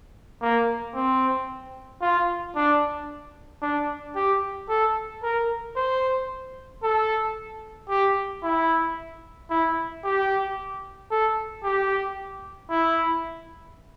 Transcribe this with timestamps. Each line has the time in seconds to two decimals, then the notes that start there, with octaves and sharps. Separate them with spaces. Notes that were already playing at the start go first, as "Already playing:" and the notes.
0.42 A#3
0.95 C4
2.02 F4
2.56 D4
3.62 D4
4.16 G4
4.69 A4
5.23 A#4
5.76 C5
6.83 A4
7.89 G4
8.43 E4
9.50 E4
10.04 G4
11.11 A4
11.63 G4
12.71 E4